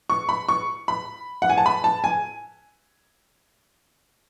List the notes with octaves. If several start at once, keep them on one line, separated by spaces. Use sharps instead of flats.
C#6
B5
C#6
B5
F#5
G#5
A5
B5
A5
G#5